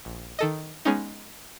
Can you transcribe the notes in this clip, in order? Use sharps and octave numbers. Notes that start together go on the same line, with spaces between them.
A#1
D#3 A4 D#5
G#3 B3 C#4 D#4